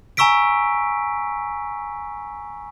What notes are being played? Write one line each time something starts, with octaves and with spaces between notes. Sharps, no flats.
G#5 A#5 C#6 E6 B6 D7